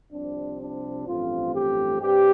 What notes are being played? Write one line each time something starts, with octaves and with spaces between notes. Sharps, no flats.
C2 C3 F3 C4 D4
D4
A1 G2 F3 A3 C4 F4
G4
G2 G3 C4 G4